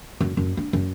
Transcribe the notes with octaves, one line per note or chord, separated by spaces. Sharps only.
F#2
F#2
D4
F#2